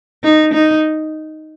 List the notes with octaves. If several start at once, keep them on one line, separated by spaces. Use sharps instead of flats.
D#4
D#4